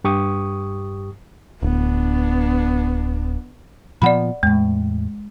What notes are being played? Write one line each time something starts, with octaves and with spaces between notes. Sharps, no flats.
G2 G4 C#6 D#6
D1 B3 D4
A#2 F3 B3 D5 F#5 B5
E2 A2 G#3